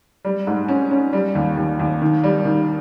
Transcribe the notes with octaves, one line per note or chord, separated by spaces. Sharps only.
G3
G#2
C#4
C#4
G3
D#2
D#2
D#2
D#3
G3
D#3